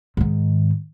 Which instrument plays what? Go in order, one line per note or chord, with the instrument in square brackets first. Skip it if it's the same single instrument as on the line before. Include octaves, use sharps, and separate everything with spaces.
[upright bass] G#2 D#3